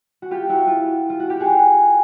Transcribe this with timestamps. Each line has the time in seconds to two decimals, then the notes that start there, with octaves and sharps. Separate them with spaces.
0.22 F#4
0.31 F4 G4
0.49 E4 F#4
0.67 F4
1.10 F4
1.20 F#4
1.30 G4
1.40 F#4 G#4